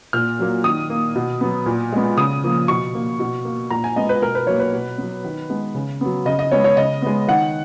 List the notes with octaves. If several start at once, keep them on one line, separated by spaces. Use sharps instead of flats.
A#2 F6
F#3 A#3
D#3 D#6
A#3
B2
F#3 B3
A#2
G#3 B3
C#3 D#6
F3 A#3
B2 C#6
A#3
B2
A#3
A#2 A#5
G#5
G#3 B3 D#5
B4
B2 A#4
B4
F#3 A#3 C#5
B4
B2
F#3 B3
D#3
G#3 B3
C#3
F#3 B3
C#3 D#5
D#5
G#3 B3 C#5
C#5
C#3 D#5
G#3 B3
D#3 F#5